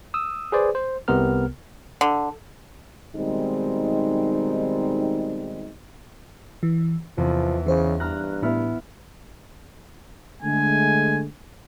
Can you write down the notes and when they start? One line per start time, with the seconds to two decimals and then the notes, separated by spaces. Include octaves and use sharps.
0.14 D#6 E6
0.52 G#4 B4 C5 D5
0.75 C5
1.08 C2 C3 B3 A#4 F6
2.01 D3
3.16 B2 D#3 G3 G#3 C4 D#4
6.63 E3
7.18 E2 C3 F3
7.67 C#3 E3 C5 C#5
8.00 G2 A#5 F6 F#6
8.42 A2 B3 E4 F6
10.42 D3 G#3 A3 G#5